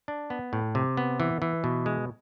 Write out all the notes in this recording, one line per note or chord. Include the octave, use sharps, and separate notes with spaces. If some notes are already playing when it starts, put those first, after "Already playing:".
D4
B3
A2
C3
B3
E3
E3
B2
G#3